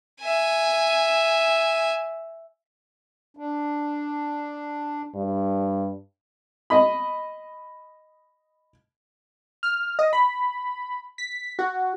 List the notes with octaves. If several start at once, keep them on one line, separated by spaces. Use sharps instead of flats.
E5 G#5
D4
G2
D#5 B5
F6
D#5
B5
B6
F#4